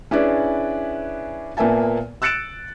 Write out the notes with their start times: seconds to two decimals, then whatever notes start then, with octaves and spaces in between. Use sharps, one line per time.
0.11 C#4 D4 E4 G#4 B4 D5
1.57 A#2 A#3 B3 E5 G#5 A5
2.22 E6 F#6 A6 C#7 D7 E7